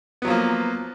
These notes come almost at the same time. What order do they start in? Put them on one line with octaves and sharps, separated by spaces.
B3 F#3 F3 A#3